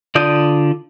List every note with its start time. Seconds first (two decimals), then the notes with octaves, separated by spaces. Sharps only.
0.15 D3 F4 D5 D#6 G6